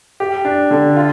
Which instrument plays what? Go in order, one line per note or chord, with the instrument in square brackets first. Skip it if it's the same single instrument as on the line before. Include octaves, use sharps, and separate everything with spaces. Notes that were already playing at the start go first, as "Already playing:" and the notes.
[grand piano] G4
D4
D3
F4